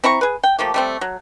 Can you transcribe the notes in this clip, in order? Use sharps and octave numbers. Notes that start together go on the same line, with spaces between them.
C4 E4 A#5 C#6
G#4 B4
G5
F3 A3 A#3 G4
G3 A3 C4
F#3